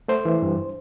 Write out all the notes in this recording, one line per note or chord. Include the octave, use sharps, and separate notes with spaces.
A3 C5
E3
G2